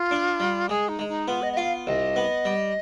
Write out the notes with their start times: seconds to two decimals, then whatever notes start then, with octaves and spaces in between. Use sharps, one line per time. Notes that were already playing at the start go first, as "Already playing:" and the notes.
Already playing: F4
0.11 D4
0.40 G3
0.69 G#3 G#4
0.89 D#4
0.99 G#3
1.09 D#4
1.28 B3 F4
1.42 D#5
1.53 D#5
1.57 F4 F5
1.87 C2 D#5
2.16 B3
2.45 G3